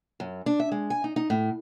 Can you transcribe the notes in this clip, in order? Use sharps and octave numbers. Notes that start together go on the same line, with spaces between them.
F#2
D4
E5
G#3
G#5
D#4
D#4
A2